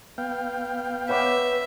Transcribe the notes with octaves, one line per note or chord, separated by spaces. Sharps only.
B3 F5 G5
B4 C#5 E5 F#5 D6